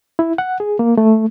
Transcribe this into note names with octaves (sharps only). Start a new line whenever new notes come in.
E4
F#5
G#4
A#3
A3